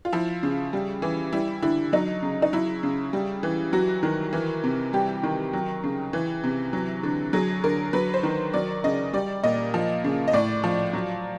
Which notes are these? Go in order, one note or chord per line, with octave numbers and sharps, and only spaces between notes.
F4
F3 E4
C#3
G3
E3
G3 E4
D3 E4
F#3 D#4
C#3
D#4
F#3 E4
C#3
G3
E3
F#3 F#4
D#3
E3
C3
G3 G4
D#3
F#3
C#3
E3
C3
F#3
D3
F#3 G#4
D3 A#4
F#3 B4
C5
D#3
F#3 D5
C#3 D#5
G3 D5
A#2 D#5
F3
C#3
D#5
A2 D5
F3
F#3